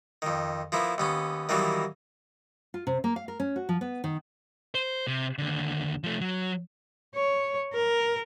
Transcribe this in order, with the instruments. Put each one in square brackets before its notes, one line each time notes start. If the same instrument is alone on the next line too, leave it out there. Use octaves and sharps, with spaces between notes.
[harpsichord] F2 D#3
F3 A#3 B3 E4
D#2 B3 C#4
D#3 E3 F#3 G3 A#3 B3
[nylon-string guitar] F4
C3
A#3
F5
A#4
C#4
F#4
F3
B3
D#3
[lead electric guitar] C5
C3
D#2 D3
F3 A3
F#3
[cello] C#5
A#4